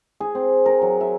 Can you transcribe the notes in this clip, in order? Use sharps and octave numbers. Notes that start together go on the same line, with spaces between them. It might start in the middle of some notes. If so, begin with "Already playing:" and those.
G#4
C4
A#4
F#3
E5